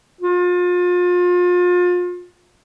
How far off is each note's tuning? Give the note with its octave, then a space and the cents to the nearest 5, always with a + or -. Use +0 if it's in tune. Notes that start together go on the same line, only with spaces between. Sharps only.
F4 +35